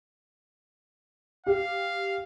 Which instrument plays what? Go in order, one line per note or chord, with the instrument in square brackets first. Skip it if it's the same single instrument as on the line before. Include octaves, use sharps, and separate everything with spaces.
[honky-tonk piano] G4 [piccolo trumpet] F5